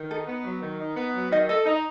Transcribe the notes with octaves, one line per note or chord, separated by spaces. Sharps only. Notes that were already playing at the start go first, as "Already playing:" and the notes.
Already playing: D#3
D#4 A4
B3
F#3
D#3
D#4
B3
F#3
D#3 D#5
A4 D#5
D#4 D#5